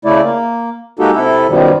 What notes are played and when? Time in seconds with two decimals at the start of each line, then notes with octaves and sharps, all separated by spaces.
0.05 C#3 A3 E4 D5
0.23 A#3
0.99 G#3 A#3 D#4 F#4 G4 A4
1.15 C3 E4 A4
1.49 F#2 B2 D#3 F3 G3